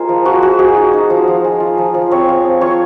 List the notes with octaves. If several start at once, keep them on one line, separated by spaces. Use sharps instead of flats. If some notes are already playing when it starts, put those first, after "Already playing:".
Already playing: G#3 F4 A#4 C5
F3
F3 F#4
G#3 F#4
G#3 G#4
D#4
D#4
F3
F3
G#3
F4
F3
F3
C4 C#5
F3
C4
F4 C#5